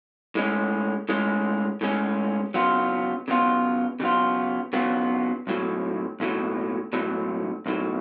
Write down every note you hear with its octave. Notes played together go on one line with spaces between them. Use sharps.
A2 G#3 C#4
A2 G#3 C#4
A2 G#3 C#4
C#3 F#3 B3 F4
C#3 F#3 B3 F4
C#3 F#3 B3 F4
C#3 F#3 B3 F4
B1 A2 F#3
B1 A2 F#3
B1 A2 F#3
B1 A2 F#3